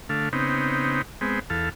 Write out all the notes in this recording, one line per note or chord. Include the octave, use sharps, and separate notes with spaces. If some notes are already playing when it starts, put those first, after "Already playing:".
D3 A3 F5
C#3 B3 C4 D#4
G#3 B3 C4
E2 A4 F5